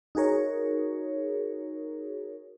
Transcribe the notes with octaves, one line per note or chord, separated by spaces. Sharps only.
D#4 F#4 G#4 A#4 C#5